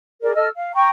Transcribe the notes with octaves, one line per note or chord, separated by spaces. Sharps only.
G#4 A#4 D5
A4 D#5 E6 F6
F5
G5 A#5 C#6